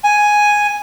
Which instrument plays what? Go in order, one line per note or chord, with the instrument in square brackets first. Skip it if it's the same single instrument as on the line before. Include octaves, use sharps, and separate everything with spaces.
[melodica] G#5